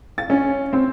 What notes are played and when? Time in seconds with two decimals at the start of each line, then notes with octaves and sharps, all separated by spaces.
0.18 A6
0.30 C#4
0.73 C4